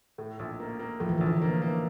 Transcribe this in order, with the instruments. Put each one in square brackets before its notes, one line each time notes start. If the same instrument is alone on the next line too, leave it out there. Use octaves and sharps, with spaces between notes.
[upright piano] A2
A#1
A#3
A#3
[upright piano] A2 [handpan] F3
[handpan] E3
[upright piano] A#1 [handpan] D3
[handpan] E3
E3
[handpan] D3 [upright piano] A#3
[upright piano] A#3